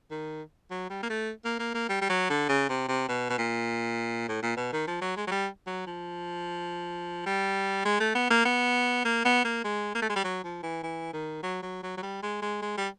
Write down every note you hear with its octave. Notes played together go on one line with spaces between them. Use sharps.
D#3
F#3
G3
A#3
A3
A#3
A#3
A#3
G3
G3
F#3
D3
C#3
C3
C3
B2
B2
A#2
A2
A#2
B2
D#3
F3
F#3
G#3
F#3
G3
F#3
F3
G3
G#3
A3
B3
A#3
B3
A#3
B3
A#3
G#3
A#3
A3
G#3
G3
F#3
F3
E3
E3
D#3
F#3
F#3
F#3
F#3
G3
G#3
G#3
G#3
G3